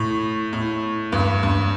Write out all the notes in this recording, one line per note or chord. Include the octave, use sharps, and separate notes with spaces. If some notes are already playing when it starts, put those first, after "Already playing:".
Already playing: A2
A2
G2
G2